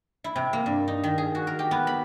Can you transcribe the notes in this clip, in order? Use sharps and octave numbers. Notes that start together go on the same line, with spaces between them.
E4
C3
A#3
G2
D#4
D#3
G#4
F#4
A#4
G4
B3
B5